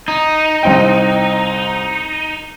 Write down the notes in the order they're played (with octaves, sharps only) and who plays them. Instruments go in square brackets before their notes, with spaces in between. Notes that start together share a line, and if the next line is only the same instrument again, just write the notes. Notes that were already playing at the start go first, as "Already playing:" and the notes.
[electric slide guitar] D#4
[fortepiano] C2 C4 G5